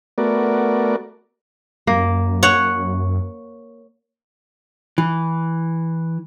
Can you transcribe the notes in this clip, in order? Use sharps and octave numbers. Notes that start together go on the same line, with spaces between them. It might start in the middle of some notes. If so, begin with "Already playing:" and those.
A3 B3 F#4 A#4 D5
F#2 A#3
C#5 F#5
E3